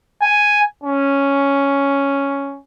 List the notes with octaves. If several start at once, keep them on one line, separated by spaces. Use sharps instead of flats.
G#5
C#4